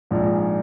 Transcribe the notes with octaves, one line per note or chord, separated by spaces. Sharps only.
A#1 G#2 F3 G#3 D4